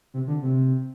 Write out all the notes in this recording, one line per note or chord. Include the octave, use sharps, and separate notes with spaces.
C3
D3
C3